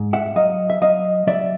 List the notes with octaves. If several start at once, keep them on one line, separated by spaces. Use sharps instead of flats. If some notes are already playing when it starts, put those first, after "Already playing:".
Already playing: G#2
E5 F#5
F#3 D#5 F5
E5
F#3 D#5 F5
F#3 D5 E5